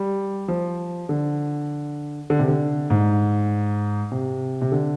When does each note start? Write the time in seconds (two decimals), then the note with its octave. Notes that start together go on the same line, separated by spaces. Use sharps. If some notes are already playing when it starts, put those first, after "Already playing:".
Already playing: G3
0.48 F3
1.09 D3
2.30 D3
2.39 C3
2.48 D3
2.90 G#2
4.12 C3
4.62 C3
4.72 D3